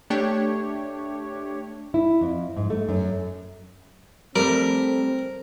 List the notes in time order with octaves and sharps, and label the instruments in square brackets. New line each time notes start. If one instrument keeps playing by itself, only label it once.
[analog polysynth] A3 D4 G4 C#5
[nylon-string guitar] E4
F2
G#2
A3
F#2
[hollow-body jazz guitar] G3 A3 [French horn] C4 [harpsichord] A#4